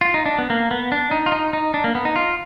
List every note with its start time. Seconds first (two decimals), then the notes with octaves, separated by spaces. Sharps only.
0.01 F4
0.14 D#4
0.26 D4
0.38 B3
0.50 A#3
0.71 B3
0.92 D4
1.11 D#4
1.26 F4
1.32 D#4
1.53 D#4
1.74 D4
1.84 A#3
1.95 B3
2.05 D#4
2.16 F4